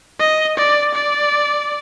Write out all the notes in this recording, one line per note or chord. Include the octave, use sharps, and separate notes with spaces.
D#5
D5
D5